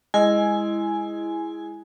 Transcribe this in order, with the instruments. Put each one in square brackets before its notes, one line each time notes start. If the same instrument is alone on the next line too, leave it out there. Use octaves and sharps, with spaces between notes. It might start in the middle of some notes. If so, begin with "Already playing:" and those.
[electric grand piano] G#3 [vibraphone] E4 [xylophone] D#5 [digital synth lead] G#5